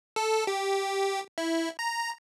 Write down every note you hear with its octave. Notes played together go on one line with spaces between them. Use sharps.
A4
G4
E4
A#5